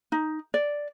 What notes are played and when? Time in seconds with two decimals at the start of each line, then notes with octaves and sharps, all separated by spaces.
0.12 D#4
0.54 D5